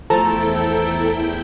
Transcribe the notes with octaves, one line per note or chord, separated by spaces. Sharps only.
E2 F3 A3 E4 A4 G5 A5 A#5